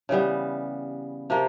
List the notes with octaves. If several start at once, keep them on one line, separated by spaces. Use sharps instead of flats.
C#3 E3 G3 B3
C3 F3 A#3